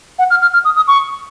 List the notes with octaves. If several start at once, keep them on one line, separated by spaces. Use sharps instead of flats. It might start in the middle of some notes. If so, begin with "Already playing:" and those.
F#5
F6
F6
F6
D#6
D#6
C#6